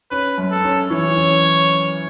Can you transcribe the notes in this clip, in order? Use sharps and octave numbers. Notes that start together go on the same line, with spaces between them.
C#4 B4
F#2
A4
C#4
E3 C#5
C#4